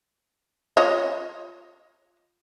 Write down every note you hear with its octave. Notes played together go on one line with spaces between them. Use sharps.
F4 C#5 D#5